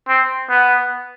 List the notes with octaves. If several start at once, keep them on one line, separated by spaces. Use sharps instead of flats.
C4
B3